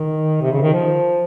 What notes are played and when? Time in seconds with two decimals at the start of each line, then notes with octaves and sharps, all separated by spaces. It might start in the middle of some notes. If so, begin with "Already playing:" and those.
Already playing: D#3
0.41 C3
0.52 C#3
0.62 D#3
0.73 F3